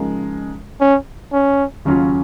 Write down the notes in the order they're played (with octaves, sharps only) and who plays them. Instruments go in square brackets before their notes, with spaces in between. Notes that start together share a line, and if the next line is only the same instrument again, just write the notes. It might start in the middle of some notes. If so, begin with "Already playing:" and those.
Already playing: [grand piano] C#3 F3 G#3 D#4 A#4
[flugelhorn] C#4
C#4
[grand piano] D#2 C#3 F#3 C#4 F4